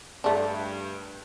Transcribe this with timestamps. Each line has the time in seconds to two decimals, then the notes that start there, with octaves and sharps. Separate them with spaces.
0.24 G2 A3 D4